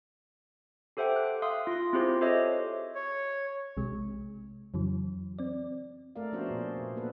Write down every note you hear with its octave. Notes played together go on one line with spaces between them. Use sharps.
G4 A4 C5 E5 F#5 G5
F#6
E5 F5 C6 D#6
F4 C6
C4 E4 F4 G4 G#4 C5
G4 A4 C5 C#5 D#5 E5
C#5
B1 C3 G#3
F2 C#3 E3 F#3
C4 D5
A3 A4 A#4 D5 F5
F3 B3 C#4 D4 F#4 C5
A#2 F3 G#4
C3
A#3 B3 A4 B4